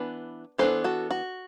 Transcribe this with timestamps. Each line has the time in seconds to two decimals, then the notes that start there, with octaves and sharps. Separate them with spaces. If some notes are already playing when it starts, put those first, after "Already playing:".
Already playing: E3 B3 D4 B4
0.58 E3 B3 D4 A4 C5
0.84 F#4 A4
1.11 F#4